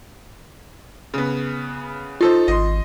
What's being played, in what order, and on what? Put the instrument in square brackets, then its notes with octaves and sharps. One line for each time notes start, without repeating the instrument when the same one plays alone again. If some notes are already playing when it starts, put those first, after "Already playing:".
[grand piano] C#3 B3
[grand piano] D#4 A4 C5 [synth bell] F4
[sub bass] G#1 [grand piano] D#5 C6